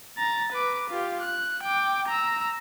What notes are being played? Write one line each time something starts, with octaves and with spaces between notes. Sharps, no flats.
A#5 A6
B4 D6
F4 G4
F#6
G5 D6
A#5 E6